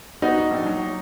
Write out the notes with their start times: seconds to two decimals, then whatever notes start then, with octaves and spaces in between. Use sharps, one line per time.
0.22 B3 D#4 F#4
0.38 G#2
0.51 A#1
0.66 F#3